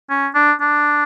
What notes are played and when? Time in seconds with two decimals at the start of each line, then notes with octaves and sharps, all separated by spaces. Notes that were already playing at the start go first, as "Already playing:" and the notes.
0.10 C#4
0.35 D4
0.61 D4